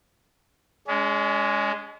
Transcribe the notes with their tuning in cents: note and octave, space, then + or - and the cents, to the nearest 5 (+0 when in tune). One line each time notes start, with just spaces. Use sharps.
G#3 +0 C#4 +40